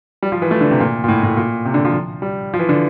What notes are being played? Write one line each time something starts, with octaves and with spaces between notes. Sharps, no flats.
G3
F3
E3
A3
D3
C3
A#2
A#2
A2
A2
A#2
C3
D3
F3
G3
F3
E3
D3